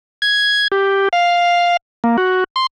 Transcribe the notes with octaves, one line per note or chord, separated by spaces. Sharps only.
G#6
G4
F5
A#3
F#4
C6